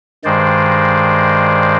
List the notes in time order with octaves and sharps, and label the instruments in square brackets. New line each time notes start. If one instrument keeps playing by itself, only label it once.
[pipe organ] G2 D#3 G#3 C5 D5